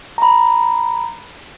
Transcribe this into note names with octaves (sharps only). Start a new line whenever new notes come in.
A#5 B5